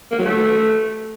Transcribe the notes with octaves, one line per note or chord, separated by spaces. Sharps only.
A#3
F#3
A3